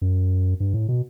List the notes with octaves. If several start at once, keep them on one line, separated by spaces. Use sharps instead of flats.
F#2
G2
A2
B2